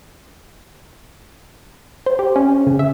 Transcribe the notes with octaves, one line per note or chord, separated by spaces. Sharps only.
C5
G4
C#4
C#3
E5